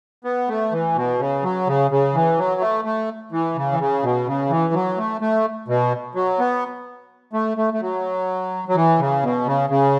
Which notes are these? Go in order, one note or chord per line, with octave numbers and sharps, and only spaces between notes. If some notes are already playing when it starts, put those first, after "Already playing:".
B3
A3
E3
B2
C#3
F#3
C#3
C#3
E3
F#3
A3
A3
E3
C#3
E3
C#3
B2
C#3
E3
F#3
A3
A3
B2
F#3
B3
A3
A3
A3
F#3
F#3
E3
C#3
B2
C#3
C#3